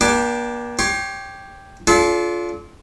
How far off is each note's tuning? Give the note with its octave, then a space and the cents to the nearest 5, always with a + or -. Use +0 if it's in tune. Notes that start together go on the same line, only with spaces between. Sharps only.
A#3 +45 D4 +0 G4 +0
G4 +0 C#5 +0 C6 +35
D4 -35 F4 +0 A4 -35